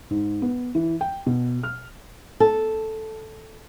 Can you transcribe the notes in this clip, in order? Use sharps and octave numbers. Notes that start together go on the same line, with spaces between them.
G#2
B3
E3
G5
B2
F6
A4